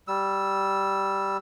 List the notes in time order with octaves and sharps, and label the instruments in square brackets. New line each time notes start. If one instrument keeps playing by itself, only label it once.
[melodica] G3 E6